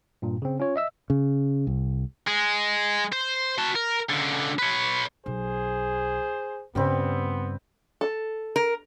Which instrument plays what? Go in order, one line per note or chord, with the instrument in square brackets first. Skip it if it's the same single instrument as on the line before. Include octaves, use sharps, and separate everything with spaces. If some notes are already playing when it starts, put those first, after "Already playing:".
[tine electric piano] G2 A#2
C#3 C4
C#4 F4 C#5
D#5 E5 E6
[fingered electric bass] C#3
C2
[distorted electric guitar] G#3
C5
F#4 A5
A#4
C#2 D3
B4 C#5
[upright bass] B1 [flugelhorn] G#4 [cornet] C5
[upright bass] G2 C#3 [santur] G3 C4 B4 [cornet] B3
[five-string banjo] A4
[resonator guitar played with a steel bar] A#4